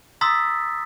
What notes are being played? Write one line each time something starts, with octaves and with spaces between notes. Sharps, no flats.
A#5 C6 D#6 E6 A6 B6